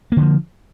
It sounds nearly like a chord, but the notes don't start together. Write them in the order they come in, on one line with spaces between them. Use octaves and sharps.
A#3 D3 F3